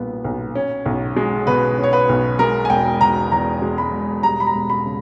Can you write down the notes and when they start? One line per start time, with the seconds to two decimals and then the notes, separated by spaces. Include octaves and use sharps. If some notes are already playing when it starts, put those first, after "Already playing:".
Already playing: B1 A#2 G3 B3
0.25 B1
0.55 C#4
0.86 B1
1.16 G#3
1.47 B2 B4
1.78 C#4
1.84 C#5
1.93 B4
2.09 B1
2.39 G#3 A#4
2.65 G#5
2.70 E1 G5
3.01 B2 A#5
3.32 E2 A#5
3.62 G#3
3.78 B5
3.93 E1
4.23 G3 A#5
4.40 B5
4.47 A#5
4.55 E1
4.70 B5
4.86 C#3